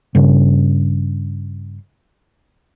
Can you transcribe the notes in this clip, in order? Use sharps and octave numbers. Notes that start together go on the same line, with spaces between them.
G2 C#3